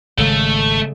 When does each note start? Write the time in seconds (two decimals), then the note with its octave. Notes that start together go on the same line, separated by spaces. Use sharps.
0.18 G#1 C#3 G#3 A3 A4